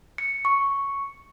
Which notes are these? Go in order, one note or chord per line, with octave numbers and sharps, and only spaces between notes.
C#7
C#6